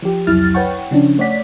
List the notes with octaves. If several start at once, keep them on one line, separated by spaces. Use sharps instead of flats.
F3 G4
C2 F2 F#3 E4 F6 A6
B4 C#5 F#5 G5 C#6
C#3 F3 C#4 D4
A3 C#5 D5 F#5 B6